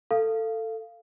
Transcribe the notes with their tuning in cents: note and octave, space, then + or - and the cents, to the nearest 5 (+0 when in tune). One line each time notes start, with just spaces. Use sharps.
A4 +15 F5 -15